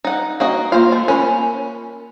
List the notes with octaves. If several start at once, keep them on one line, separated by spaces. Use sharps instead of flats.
D#4 F#5
A#3 F#4 D#5
A#3 F4 C5 F5
A3
C#4 A#4 G#5 B5